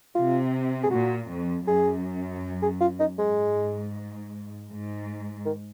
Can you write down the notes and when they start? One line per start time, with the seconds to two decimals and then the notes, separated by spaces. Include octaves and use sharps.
0.15 C3 F4
0.84 G#4
0.91 A#2 F#4
1.29 F2
1.67 F#2 G#4
2.63 G#4
2.81 F4
3.00 D#4
3.19 G#2 G#3
4.70 G#2
5.46 D#3